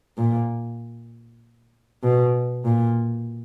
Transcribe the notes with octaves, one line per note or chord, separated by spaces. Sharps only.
A#2
B2
A#2